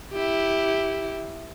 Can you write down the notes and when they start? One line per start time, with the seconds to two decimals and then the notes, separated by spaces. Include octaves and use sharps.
0.13 E4 G4